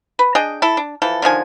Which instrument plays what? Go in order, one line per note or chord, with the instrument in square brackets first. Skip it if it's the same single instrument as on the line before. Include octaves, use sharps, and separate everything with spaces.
[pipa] B4
D4 G#4 D#5 G5
E4 A4
D4
E3 F3 A4
D3 D#3 F3 G#5